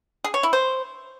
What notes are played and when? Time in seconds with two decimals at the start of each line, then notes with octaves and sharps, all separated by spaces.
0.24 G#4
0.34 C#5
0.43 E4
0.53 C5